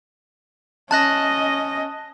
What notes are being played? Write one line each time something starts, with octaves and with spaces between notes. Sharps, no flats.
C#4 D#5 A5 F#6 A#6